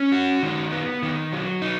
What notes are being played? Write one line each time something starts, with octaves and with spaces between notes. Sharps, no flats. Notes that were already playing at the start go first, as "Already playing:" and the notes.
Already playing: C#4
F#4
D#3
B3
D#3
F#3
D#4